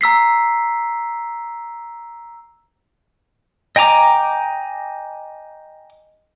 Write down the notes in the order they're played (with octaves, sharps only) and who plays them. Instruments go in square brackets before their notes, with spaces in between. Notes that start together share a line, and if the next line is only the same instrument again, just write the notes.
[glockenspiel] A#5 E6 B6 C7
[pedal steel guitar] D#5 G5 G#5 A#5 D6